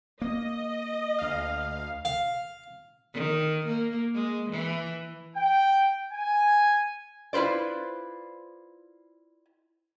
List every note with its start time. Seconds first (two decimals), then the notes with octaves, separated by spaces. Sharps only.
0.22 A#3 D#5
1.19 D2 F5
2.05 F5
3.14 D#3
3.67 A#3
4.15 G#3
4.50 E3
5.35 G5
6.13 G#5
7.33 E4 F4 B4 C5 D5